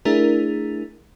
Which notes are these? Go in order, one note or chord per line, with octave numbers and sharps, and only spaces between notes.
A3 D4 E4 G#4 A#4